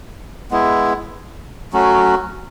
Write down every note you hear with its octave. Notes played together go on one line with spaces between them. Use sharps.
G#3 B3 E4
F#3 A3 C#4 F#4